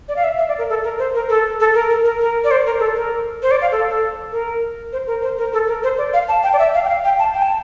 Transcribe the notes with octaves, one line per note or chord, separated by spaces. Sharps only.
D5
F5
E5
E5
D5
A#4
A4
A#4
C5
A#4
A4
A4
A#4
A#4
A#4
A#4
D5
C5
A#4
A4
A#4
C5
D5
F5
A4
A4
A#4
C5
A#4
C5
A#4
A4
A#4
C5
D5
F5
A5
G5
D5
E5
F5
G5
F5
G5
A5
G5
A5